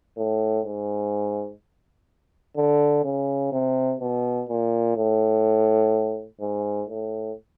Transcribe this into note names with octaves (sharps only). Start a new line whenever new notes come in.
A2
G#2
D3
C#3
C3
B2
A#2
A2
G#2
A2